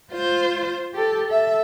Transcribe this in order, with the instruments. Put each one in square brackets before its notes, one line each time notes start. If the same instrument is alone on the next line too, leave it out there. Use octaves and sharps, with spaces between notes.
[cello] F4 C5
G4 A4
A4 E5